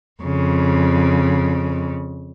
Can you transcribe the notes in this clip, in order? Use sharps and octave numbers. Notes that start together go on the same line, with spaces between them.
F2 C#3